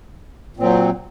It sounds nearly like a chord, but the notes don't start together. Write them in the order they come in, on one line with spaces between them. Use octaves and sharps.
A#2 C4 F#3